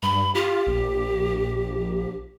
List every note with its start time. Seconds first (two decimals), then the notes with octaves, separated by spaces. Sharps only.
0.03 G2 B5
0.35 F4 G4
0.67 A#1